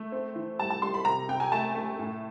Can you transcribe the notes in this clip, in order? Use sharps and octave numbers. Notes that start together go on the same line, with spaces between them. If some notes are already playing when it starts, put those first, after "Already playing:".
Already playing: A3
C4
E3
G3 A5
A5
G3 C6
B5
C3 A#5
C3 G5
G#5
A3 A5
A3
A2